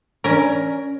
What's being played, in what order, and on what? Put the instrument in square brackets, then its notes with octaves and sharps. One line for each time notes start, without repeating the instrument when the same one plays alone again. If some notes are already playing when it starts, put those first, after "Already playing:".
[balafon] E3 D4 D5 [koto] C#4 A#4